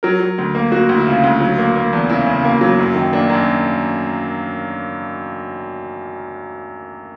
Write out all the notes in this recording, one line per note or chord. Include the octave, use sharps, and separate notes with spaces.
F#3 A#4
F#3
D2
A#3
A#3 F#4
D2
E4
C#3 F4
D2
F#3
A#3
A#3
E2
C#3 E4
C#3
A#3
F#3
F#2
D#3
A#3 D4
F#2 D4